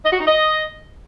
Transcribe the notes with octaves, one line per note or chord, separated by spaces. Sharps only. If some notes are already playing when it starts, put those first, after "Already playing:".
D#5
F#4
D#4
D#5